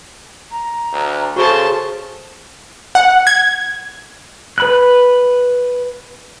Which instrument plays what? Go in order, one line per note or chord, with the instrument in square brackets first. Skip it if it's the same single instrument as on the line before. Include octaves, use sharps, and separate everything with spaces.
[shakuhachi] A#5
[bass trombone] D2
[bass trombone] C#3 [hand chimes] F#4 G#4 A4 [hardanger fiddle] C5 A5 [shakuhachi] C#6
[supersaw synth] F#5
G#6
[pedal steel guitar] B4 B5 F#6